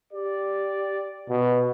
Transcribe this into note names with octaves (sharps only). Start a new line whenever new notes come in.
G4 D5
B2